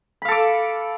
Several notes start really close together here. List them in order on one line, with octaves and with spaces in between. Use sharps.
B5 F5 A4 D6